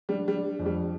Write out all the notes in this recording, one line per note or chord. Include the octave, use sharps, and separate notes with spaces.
G3 D4
G3
D4
F2
G3